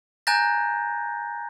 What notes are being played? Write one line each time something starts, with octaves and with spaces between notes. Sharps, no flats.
G#5 A#5 F#6 G6 A6 A#6